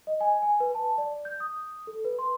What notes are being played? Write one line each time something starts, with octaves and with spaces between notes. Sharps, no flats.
D#5
G#5
G#5
B4
A5
D5
G6
D#6
A4
B4
C6